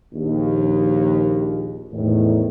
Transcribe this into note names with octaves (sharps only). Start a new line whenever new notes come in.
A#1 D#2
E2 A2 D#3